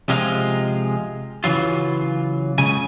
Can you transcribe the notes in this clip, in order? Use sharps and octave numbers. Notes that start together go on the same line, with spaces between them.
C3 F3 G#3 F4
C#3 E3 F#3 F4
C#2 C#3 G#5